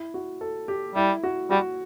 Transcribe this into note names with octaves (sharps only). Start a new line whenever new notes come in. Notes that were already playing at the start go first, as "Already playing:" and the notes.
Already playing: E4
F#4
A4
G4
G3 E4
F#4
G3 F#4